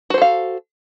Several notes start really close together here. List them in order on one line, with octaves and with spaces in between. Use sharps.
F#4 C5 A4 F5